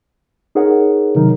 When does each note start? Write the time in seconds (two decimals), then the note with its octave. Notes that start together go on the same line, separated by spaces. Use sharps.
0.55 D#4 G#4 A#4 C#5 F#5
1.15 C3 D#3 F#3 D#4 A#4